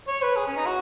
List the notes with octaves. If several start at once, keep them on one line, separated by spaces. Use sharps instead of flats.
C#5
B4
G#4
C#4
D#4
F#4